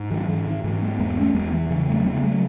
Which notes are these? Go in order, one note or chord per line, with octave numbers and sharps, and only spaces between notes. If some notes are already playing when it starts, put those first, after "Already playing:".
Already playing: G#2
D#3 F#3
G#2 E3
D#3
G#2 E3
G#3 B3
E2 G#3 B3
A3 C#4
E2 G#3 B3
E3
C#3 E3
F#3 A3
C#3 G#3 B3
F#3 A3